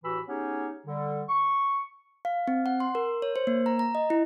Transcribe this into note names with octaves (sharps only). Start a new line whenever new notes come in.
A2 E3 F#4 G4 B5 E6
B3 C#4 D#4 G4 G#4 C#5
D3 G3
C#6
F5
C4
F#5
C6
A#4
C#5
C5
A#3
A#5
A#5
D#5
E4